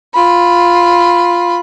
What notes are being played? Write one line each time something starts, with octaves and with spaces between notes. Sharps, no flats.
F4 B5